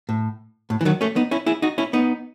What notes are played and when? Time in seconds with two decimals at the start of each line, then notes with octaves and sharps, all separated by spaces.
0.09 A2
0.70 A2
0.81 E3
0.85 D#3 F#3
1.01 A3 C#4
1.16 B3 D#4
1.31 C#4 E4
1.46 E4 G#4
1.62 D#4 F#4
1.78 C#4 E4
1.93 B3 D#4